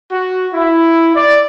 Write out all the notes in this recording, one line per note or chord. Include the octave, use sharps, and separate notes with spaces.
F#4
E4
D5